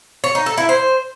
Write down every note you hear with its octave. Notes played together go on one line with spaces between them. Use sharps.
C#5
D#4
A4
E4
C5